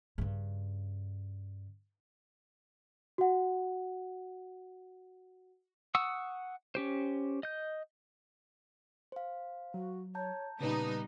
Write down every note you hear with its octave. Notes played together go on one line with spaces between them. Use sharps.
G2 C#3
F#4 F#5
F#5 C#6 D#6 E6
C#4 G4 C5
D#5 G6
C5 F5
F#3 F#4
C#5 A5 A#5 G6
A#2 C#3 G3 B3 D#4 B4